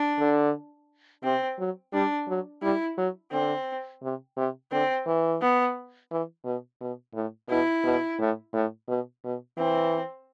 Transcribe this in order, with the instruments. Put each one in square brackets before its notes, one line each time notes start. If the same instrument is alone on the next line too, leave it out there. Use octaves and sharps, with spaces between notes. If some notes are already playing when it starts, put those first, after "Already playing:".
Already playing: [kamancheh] D4
[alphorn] D3
[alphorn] C3 [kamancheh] C4
[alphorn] F#3
[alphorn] G3 [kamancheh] D4
[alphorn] F#3
[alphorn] G3 [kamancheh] E4
[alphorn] F#3
[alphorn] D3 [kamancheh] C4
[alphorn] C3
C3
[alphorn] D3 [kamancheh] C4
[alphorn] E3
[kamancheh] B3
[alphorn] E3
B2
B2
A2
[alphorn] B2 [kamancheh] E4
[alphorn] B2
A2
A2
B2
B2
[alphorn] E3 [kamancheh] C4